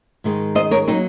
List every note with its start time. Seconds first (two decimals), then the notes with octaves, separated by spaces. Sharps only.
0.24 G#2 D#3 G#3
0.55 C5 D#5
0.71 A#4 C#5
0.88 F#3 A#3 C4 D#4